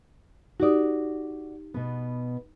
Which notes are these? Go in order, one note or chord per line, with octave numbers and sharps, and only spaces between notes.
D#4 F#4 G4 D5 D#6
B2 B3